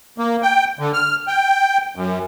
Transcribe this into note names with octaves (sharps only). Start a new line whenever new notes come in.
A#3
G5
D3
F6
G5
F#2